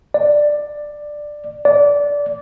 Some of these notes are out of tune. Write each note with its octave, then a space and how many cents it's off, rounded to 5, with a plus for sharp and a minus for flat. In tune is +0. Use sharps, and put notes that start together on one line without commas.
D5 +10
D5 -20